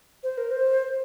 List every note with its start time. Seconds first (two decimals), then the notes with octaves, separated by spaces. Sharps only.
0.23 C5
0.37 A#4
0.51 C5